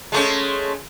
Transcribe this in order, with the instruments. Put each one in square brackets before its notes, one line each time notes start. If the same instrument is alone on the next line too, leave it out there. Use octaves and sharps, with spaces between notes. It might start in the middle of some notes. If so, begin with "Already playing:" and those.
[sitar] G#3 A3 C#4